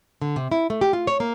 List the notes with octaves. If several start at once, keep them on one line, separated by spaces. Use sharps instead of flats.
D3
C3
E4
A3
G4
F4
C#5
A#3